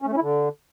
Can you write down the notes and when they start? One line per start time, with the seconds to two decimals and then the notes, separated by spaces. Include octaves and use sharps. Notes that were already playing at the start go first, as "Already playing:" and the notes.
0.02 C#4
0.07 A3
0.12 C#4
0.17 E4
0.22 D3